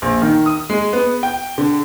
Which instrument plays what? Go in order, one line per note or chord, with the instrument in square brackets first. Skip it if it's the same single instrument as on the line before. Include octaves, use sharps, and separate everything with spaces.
[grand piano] A#1
D#3
D#6
G#3
B3
G5
D3